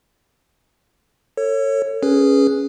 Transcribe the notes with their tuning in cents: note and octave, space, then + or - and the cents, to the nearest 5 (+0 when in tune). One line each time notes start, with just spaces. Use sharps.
A4 +35 C#5 -10
C#4 +0 G#4 +0 B4 -15